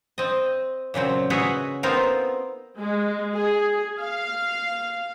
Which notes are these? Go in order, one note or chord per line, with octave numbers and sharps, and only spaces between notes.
C4 D#5
A#2 C#3 F#3 C4
F#4 G#4 B4 C#5 D#5 E5
B3 C4 D#4 F4 A#4
G#3
G#4
F5